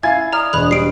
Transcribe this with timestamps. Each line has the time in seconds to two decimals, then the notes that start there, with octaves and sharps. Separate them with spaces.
0.03 E4 F5 G#5 G#6 A6
0.33 D5 A#5 D#6 F6
0.53 E1 B5 F#6 F7
0.71 G3 C7 D7